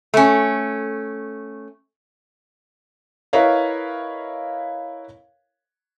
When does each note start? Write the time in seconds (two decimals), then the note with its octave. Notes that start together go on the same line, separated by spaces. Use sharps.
0.14 A3 C#4
3.33 E4 A#4 B4 C#5 D#5 F5